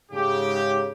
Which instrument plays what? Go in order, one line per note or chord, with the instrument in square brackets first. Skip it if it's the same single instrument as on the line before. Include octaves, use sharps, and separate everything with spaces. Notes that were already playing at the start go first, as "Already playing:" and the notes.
[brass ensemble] G#2 C#3 G4